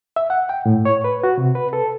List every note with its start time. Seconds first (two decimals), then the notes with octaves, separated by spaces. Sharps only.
0.16 E5
0.30 F#5
0.49 G5
0.66 A2
0.85 C#5
1.04 B4
1.23 F#4
1.38 C3
1.55 B4
1.73 A4